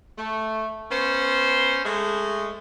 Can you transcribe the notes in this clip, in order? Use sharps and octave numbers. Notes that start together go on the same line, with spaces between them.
A3
B3 C#4 C5
G#3 A3